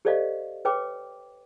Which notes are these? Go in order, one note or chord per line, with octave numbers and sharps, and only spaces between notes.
G4 A4 C5 D5 D#5 F5
B4 C#5 G5 D6